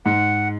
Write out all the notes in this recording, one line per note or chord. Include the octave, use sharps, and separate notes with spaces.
G#2 F#5